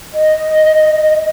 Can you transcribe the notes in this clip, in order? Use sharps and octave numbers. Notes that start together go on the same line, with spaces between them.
D#5